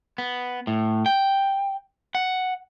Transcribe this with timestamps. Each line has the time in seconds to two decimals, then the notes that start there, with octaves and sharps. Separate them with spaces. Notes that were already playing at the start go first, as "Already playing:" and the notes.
0.18 B3
0.67 A2
1.06 G5
2.15 F#5